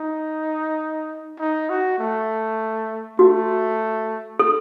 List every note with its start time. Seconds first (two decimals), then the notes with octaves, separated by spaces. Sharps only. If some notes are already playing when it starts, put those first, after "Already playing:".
Already playing: D#4
1.39 D#4
1.69 F#4
1.99 A3
3.19 A3 F#4
4.39 A4